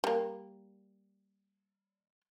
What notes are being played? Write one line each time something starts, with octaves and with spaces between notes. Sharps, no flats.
G3 A#3